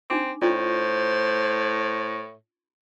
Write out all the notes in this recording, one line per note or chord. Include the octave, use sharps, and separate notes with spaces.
C4 D4 D#4 D6
A2 C#4 F4 C5 D5